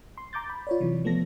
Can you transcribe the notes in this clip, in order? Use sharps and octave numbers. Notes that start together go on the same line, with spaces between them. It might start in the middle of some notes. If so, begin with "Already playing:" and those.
C6
A#5 D6 G6 A6
B5
F4 C#5 D5
C3 E3 F#3
F3 A3 B3 A4 A#6